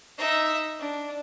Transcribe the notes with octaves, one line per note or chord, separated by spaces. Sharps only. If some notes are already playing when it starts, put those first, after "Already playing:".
D#4 E5
D4